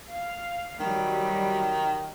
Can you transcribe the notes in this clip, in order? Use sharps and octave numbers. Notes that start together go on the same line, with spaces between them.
F5
D#3 F#3 G3